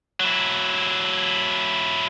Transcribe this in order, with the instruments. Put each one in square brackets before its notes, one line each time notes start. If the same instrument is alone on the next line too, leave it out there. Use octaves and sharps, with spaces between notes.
[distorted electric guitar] F#3 E4